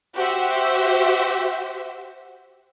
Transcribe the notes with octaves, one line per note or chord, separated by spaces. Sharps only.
F#4 G4 C5 E5